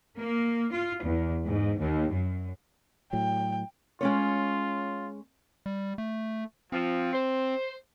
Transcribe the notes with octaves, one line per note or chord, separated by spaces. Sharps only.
A#3
F4
E2
G#2
D#2
F#2
A2 F#3 G5
G#3 C#4 F4 C#5
G3
A3
F3 C4
C5